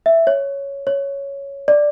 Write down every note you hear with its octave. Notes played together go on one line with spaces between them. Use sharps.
E5
C#5
C#5
D5